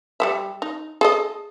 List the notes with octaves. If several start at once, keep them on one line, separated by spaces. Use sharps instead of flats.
G3 B3 E5
D#4
G#4 A4 D#5